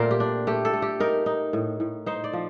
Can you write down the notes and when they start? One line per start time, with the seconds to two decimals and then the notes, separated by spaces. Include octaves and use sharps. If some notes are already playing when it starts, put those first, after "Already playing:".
Already playing: A#2 A3 C4 A#4 C5 D5
0.11 G4
0.20 D4
0.47 A3 G4
0.65 A4
0.73 A3
0.82 G4
1.00 D#4 A#4
1.26 D#4
1.53 A2
1.80 A2
2.06 D#4 C5
2.24 D5
2.33 F3